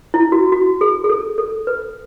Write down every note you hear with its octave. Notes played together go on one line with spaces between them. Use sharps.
E4
F#4
F#4
G#4
G#4
A4
A4
B4